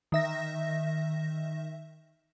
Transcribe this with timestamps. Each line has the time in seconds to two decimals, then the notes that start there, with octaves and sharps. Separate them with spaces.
0.12 D#3 E5 A#6